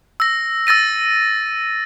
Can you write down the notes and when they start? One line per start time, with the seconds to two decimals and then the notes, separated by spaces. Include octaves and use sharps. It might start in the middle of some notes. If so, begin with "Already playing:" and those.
0.20 E6 A#6
0.67 E6 A6 A#6 D#7